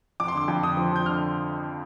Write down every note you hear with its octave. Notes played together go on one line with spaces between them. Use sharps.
F2 D6
C6
D3 D6
F2
D3 D#6
F3
F2 G6
D3 F6